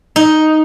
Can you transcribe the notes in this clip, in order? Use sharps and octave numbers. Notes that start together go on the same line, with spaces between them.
D#4